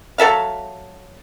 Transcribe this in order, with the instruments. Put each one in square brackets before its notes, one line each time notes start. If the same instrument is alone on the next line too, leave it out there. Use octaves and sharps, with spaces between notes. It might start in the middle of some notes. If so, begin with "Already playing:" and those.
[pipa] F#3 A4 E5 F5